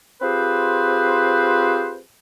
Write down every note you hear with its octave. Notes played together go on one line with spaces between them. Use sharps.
C4 F4 G4 G#4 B4 C5